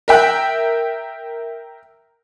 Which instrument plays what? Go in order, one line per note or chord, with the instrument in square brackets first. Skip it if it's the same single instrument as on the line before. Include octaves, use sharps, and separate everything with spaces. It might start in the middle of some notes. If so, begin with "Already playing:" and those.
[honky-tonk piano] A#4 E5 G5 F#6